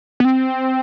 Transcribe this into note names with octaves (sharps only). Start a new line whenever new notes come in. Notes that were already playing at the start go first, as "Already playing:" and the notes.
B3
C4